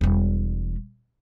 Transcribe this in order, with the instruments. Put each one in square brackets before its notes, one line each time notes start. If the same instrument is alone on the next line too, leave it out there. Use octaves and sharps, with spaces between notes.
[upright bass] E1 G3